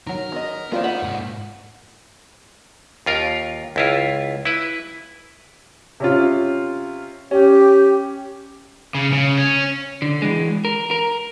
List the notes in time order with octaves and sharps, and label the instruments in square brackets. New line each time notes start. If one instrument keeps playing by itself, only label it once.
[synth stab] D#3 F#3 [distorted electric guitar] A#4
[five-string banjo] B3 D#5
[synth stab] A#3 C4 F4 [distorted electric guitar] A#4 D#5 [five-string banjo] B4 D5
[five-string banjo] F#5 [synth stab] B5
[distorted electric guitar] G#2 A#3
[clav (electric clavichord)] D#2 F4 A#4
C#2 E4 F4
E4 B4
[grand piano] C3 C#4 F4
[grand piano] C#4 [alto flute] G4
[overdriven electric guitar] C#3
C#3
C#4
[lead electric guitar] D3
E3 G#3
A#4
A#4